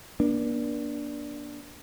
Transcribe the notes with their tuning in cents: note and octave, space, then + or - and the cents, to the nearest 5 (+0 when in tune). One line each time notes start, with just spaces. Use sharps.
A#3 +45 D4 +0